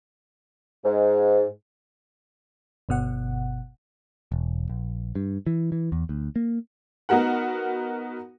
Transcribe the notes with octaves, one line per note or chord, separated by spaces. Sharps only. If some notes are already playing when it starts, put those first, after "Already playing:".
G#2
G1 B2 F#5
E1
A#1
G2
E3
E3
E2
D2
A#3
B3 D#4 F#4 A#4 F#5